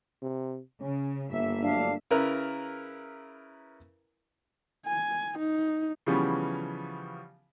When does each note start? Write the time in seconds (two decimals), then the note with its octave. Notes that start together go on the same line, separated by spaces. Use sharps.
0.22 C3
0.81 C#3 C#4
1.30 G1 G2 A#3 E5
1.63 F#3 A3 D4 F5
2.11 C#3 E4 A#4 B4
4.86 G#5
5.39 D#4
6.06 C#3 E3 F3 G3 B3 C#4